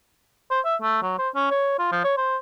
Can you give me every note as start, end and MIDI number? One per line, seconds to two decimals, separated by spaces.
0.50 0.60 72
0.65 0.76 76
0.82 0.99 57
1.02 1.15 54
1.19 1.29 72
1.35 1.49 61
1.51 1.74 73
1.79 1.87 65
1.92 2.00 53
2.04 2.15 73
2.17 2.37 72